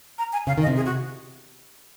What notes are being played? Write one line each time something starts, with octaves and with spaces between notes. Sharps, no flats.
A#5
G#5
C#3 F5
D#3
D#5
C3
G#4
F#4